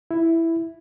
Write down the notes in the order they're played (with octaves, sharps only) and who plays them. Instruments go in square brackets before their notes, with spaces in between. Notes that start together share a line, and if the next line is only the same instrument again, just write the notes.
[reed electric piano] E4